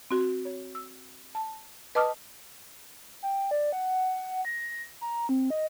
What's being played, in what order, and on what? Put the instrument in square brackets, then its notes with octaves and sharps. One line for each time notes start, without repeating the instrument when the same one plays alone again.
[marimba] C4 F#4
C#5
E6
A5
B4 D#5 A5 D6 D#6 F6
[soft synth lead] G5
D5
F#5
A#6
A#5
C4
D#5